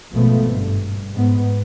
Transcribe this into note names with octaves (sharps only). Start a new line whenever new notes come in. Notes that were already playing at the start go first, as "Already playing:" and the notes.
G#1 B2 F3 A3 B3
G2
G#2 B3